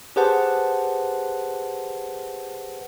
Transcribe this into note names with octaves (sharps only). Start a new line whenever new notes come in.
G4 G#4 B4 C5 F#5 A5